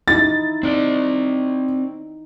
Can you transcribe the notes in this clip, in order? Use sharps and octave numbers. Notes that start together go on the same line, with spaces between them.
D#4 E4 A6
C4 D#4 D5